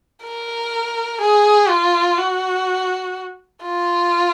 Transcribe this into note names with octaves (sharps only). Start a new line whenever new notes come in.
A#4
G#4
F4
F#4
F4